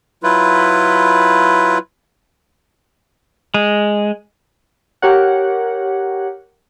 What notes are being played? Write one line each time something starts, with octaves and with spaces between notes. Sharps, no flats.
F#3 E4 F4 B4
G#3
G4 A#4 C#5 F#5